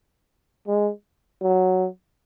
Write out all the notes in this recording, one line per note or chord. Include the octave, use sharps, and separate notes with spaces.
G#3
F#3